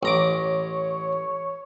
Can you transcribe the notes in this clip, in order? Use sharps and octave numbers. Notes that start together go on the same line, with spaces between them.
A1 C#5 A#5 D6